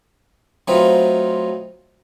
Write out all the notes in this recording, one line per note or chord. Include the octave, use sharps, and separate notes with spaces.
F#3 A3 B3 C4 D#4 F4